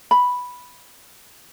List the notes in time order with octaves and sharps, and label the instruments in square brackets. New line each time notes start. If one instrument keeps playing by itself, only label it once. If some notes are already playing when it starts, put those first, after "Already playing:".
[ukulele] B5